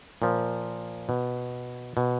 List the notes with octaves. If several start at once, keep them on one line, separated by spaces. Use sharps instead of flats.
A#2 F3
B2
B2